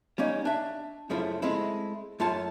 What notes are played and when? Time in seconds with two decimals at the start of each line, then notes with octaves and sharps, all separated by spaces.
0.18 G3 A#3 C#4 D#4
0.45 D4 E5
1.10 F#2 C#3 F3 A3 E4
1.42 G#3 A3 C4 E4
2.20 F#2 A3 F4 C#5 A5